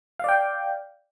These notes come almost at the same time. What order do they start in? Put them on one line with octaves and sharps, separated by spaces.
F5 D5 G5